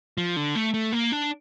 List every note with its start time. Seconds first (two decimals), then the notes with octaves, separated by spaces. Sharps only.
0.18 F3
0.36 D3
0.55 A3
0.74 A3
0.93 A#3
1.12 D4